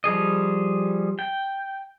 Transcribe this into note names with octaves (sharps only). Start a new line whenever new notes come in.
F3 G3 G#4 D#5
G5